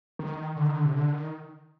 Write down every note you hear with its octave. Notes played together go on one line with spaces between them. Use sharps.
D#3
D3
D#3
D3
C3
D3
D#3